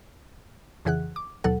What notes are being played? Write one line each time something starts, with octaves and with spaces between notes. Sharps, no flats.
F2 C#3 E3 G#4 F#5 F#6
D6
D#2 B2 F#3 A4 F#5